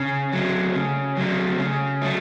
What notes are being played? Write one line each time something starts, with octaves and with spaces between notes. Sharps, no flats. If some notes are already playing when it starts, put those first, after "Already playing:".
Already playing: C#3
F#3 A3
C#3
F#3 A3
C#3
F#3 A3